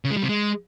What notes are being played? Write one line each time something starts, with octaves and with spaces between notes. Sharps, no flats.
C#3
G#3
G3
C3
G#3